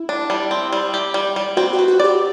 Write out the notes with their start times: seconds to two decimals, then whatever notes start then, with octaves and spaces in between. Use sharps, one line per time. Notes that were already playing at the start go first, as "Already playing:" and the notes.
Already playing: E4
0.09 D4
0.30 G3
0.51 C4
0.73 G3
0.94 G4
1.14 G3
1.36 G3
1.57 C4 F#4
1.73 F#4
1.79 B4
1.88 F#4
1.99 G4 D5